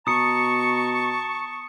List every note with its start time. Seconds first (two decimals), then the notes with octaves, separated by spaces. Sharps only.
0.07 B2 A5 A#5 C#6 D#6 C#7